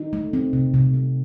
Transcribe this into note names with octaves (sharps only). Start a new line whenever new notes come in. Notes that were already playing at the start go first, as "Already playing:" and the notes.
Already playing: D#4
A3
C4
C3
C3
C4